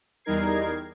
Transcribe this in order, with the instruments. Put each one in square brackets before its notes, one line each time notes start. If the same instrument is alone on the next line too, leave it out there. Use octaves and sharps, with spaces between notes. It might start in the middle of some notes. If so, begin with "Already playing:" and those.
[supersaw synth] E2 G3 D#4 A#4 G#6 C7